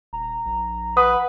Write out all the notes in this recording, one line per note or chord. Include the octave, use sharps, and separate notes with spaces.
D#1 A#5
A#1
B4 F#5 D#6